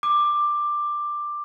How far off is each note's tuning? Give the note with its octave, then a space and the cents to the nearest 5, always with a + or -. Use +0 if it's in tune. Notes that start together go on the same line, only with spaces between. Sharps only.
D6 +10